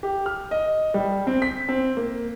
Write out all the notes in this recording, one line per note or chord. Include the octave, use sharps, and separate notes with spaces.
G4
F6
D#5
G3
C4
B6
C4
A#3